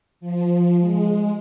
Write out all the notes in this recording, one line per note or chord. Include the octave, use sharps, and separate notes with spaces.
F3
G#3